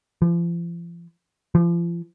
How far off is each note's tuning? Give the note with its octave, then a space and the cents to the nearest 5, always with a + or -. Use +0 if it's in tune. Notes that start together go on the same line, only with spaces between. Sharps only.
F3 -40
F3 -40